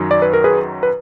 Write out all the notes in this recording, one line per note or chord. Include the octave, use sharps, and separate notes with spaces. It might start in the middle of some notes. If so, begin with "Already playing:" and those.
Already playing: F#2 D#3 F#3
D5
B4
A#4
G#4 B4
B4